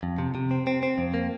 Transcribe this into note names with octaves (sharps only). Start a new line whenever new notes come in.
F2
C3
C3
C4
C4
C4
F2
A#3